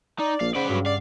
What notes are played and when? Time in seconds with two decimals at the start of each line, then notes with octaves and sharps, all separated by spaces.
0.20 D#4 D5
0.41 A#1 F5
0.55 C#3 B4 C5 D5 F#5
0.69 G2 F#3
0.86 D5 F5 C7